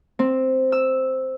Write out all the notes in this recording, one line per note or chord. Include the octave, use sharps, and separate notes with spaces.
C4
E6